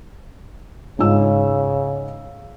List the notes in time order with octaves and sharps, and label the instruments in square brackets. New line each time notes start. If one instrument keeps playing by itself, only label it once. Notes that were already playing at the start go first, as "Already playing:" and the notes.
[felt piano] G#2 F4 E6 [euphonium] C#3